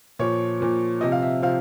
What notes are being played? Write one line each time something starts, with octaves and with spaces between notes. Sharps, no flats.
A#2 F3 C#5
A#2 F3
C3 F3 D#5
F5
E5
C3 F3 F5